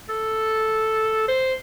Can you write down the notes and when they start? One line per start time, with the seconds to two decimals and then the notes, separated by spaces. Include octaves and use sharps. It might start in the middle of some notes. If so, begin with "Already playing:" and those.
0.09 A4
1.28 C5